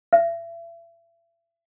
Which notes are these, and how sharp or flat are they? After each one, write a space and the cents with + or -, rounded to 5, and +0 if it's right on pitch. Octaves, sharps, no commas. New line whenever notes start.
E5 +35